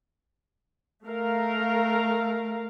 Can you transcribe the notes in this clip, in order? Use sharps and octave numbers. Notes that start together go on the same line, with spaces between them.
A3 A#4 F5